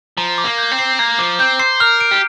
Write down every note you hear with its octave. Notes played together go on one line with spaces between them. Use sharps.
F3 A#5
D6
A#3
G6
C4
C7
A#3 A#5
F3 D6
C4 G6
C5 C7
A#4 F6
D7
G4